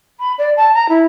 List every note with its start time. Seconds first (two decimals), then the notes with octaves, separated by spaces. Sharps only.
0.20 B5
0.38 D5
0.57 A5
0.74 A#5
0.89 E4